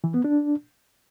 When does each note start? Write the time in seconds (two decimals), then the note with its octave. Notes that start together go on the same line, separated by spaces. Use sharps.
0.04 E3
0.14 B3
0.24 D4